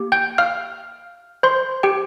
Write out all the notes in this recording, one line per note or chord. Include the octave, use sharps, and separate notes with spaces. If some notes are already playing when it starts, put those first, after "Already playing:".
Already playing: A#3 G4
G5 G6
F5 F6
C5 C6
G4 G5